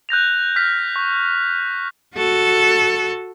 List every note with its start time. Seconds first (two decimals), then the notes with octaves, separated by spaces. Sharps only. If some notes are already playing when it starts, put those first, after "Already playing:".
0.09 F#6 G6 A#6 F7
0.56 F6 B6
0.96 C#6
2.16 F#4 A4